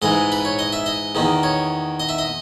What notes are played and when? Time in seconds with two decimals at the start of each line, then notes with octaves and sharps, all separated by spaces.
0.02 G#2 E3 G#3 D#5
0.32 B4
0.45 C#5
0.59 D#5
0.73 E5
0.86 D#5
1.15 E2 D#3 A#3
1.43 C#5
2.00 D#5
2.09 E5
2.18 D#5